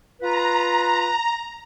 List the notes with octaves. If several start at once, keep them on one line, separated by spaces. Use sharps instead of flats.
F4 B4 A#5